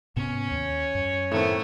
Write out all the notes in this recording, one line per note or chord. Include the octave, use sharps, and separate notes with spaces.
G#2 C3 B3 C#4
D#2 C#5
F#2
A2 D#3 A3 B3 C4